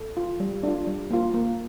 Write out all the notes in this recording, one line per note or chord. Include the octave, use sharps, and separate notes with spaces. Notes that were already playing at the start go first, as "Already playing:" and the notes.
Already playing: A4
F4
G3
D4 F4
G3
A#3 F4
A#3